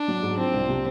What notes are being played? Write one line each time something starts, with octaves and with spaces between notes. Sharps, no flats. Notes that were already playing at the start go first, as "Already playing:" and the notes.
Already playing: D4
F#3
G#2
F3 C4
C2
C3